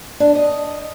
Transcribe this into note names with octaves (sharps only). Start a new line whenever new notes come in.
D4
D#5